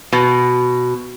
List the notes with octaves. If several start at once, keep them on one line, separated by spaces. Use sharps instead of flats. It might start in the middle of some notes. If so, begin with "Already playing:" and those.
B2